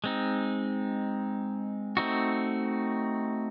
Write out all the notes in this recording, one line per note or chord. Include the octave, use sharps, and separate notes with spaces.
G#3 C4 D#4
A3 C4 D#4 F#4